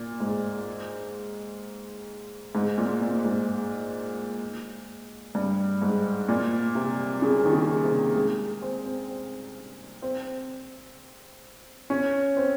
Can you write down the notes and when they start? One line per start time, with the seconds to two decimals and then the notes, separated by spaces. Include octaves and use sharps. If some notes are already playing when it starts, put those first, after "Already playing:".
Already playing: A#2
0.20 G#2
2.55 G#2
2.78 A#2
3.01 A#2
3.25 G#2
5.35 G2
5.82 G#2
6.28 A#2
6.75 C3
7.22 C#3
7.45 D#3
7.53 C#3
7.84 C3
8.15 G#3
8.62 C4
8.86 C4
10.02 C4
11.90 C#4
12.37 C4